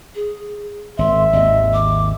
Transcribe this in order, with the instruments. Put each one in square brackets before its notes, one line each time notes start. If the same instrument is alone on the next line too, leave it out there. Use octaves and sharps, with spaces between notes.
[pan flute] G#4
[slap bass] G#1 [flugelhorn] E5 [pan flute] C6
[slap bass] G#1 D#2 [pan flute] D#5
[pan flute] D6